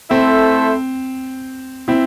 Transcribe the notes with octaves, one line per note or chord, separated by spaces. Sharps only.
A3 C4 E4 A4 C5
C4 E4